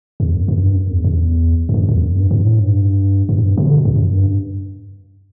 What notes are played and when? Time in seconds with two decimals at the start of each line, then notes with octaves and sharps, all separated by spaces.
0.20 E2
0.34 F#2
0.48 F#2
0.62 G2
0.76 F#2
0.91 E2
1.04 E2
1.69 E2
1.74 F#2
1.89 E2
2.03 F#2
2.16 G2
2.31 G2
2.45 A2
2.59 G2
3.29 F#2
3.37 A2
3.43 G2
3.58 B2
3.67 D3
3.76 B2
3.85 E2
3.96 E2
3.99 F#2
4.13 G2